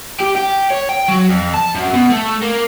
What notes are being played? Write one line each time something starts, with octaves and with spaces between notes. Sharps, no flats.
G4
G4
C#5
G5
F#3
F2
A5
F#2
B2
A3
A#3